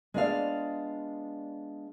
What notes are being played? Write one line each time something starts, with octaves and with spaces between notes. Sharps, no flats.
G#3 B3 D4 F4 D5 F5